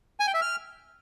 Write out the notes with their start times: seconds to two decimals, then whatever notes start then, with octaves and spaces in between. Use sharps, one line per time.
0.20 G#5
0.27 G5
0.34 E5
0.41 F6